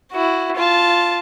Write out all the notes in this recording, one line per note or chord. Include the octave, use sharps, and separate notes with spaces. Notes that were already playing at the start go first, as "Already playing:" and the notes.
E4 F#4
F4 A5